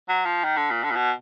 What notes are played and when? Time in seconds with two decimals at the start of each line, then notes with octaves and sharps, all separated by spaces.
0.09 F#3
0.25 F3
0.44 D#3
0.57 D3
0.70 A#2
0.84 D3
0.91 A#2
0.96 B2